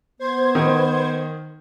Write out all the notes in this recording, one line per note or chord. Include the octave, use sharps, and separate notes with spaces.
B3 C5 G#6
D#3